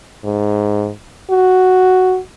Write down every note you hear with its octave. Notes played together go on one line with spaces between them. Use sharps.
G#2
F#4